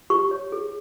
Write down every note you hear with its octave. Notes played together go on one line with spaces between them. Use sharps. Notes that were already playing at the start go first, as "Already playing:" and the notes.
G4 C#6
C#5
G#4